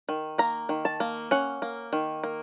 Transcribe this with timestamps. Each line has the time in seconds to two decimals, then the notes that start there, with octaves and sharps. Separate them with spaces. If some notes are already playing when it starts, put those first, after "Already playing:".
0.09 D#3
0.38 A#3 A#5
0.69 D#3
0.85 A5
1.00 A#3
1.31 C#4 F#5
1.62 A#3
1.93 D#3
2.24 A#3